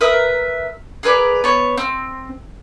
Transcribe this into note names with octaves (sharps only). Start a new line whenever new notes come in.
A#4 B4 E5 D#6
G#4 A#4 B4 D5
B3 C#5
C4